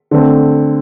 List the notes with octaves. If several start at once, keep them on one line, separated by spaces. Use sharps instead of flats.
D3 A3 C4